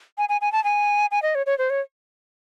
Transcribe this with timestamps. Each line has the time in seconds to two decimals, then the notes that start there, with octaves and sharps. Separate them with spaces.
0.18 G#5
0.29 G#5
0.41 G#5
0.52 A5
0.64 G#5
1.11 G#5
1.23 D#5
1.35 C#5
1.46 C#5
1.58 C5
1.70 C#5